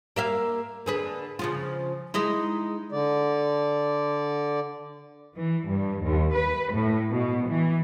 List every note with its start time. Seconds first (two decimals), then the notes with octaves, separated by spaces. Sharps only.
0.16 A#3 E5 F5
0.86 D3 G#4 B4
1.39 C#3 F3 F4
2.14 G#3 D#4 E4
2.92 D3 D5
5.36 E3
5.67 G2
6.03 D#2
6.33 B4
6.73 A2
7.10 B2
7.47 E3